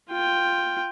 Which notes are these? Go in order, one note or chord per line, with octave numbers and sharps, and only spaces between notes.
F4 G5